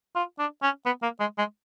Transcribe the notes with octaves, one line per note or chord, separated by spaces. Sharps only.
F4
D4
C#4
B3
A#3
G#3
G#3